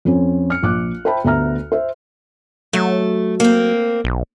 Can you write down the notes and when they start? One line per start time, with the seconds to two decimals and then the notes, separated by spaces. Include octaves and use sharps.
0.05 F2 C4 C#4
0.50 F6 C#7
0.63 A#1 D6 F#6
1.05 C5 E5 G5 A5 B5
1.24 D2 B3 E5 A#5 F6
1.72 C5 E5
2.73 F#3 A3
3.40 A#3 C4
4.04 B1